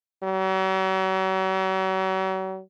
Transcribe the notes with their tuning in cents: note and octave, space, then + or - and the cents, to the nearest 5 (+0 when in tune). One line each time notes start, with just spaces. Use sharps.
F#3 +40